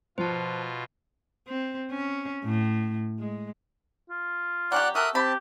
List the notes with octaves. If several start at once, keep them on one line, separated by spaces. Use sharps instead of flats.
B2 F3 F4 C5 A5
C4
C#4
A2
G#3
F4
F#3 C#4 G4 D5 F#5 F#6
F#4 G4 A4 A#4 E5 D#6 F#6
C4 G4 A5 B5